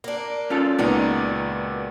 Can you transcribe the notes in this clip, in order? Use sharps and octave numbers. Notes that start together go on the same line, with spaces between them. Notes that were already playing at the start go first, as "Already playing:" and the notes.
A#3 D4
C#4 F4 A4
C#2 A#2 B3 D4 D#4 F#4